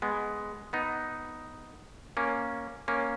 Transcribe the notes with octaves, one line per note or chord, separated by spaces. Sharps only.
G#3 B3
B3 D#4
A#3 C#4
A#3 C#4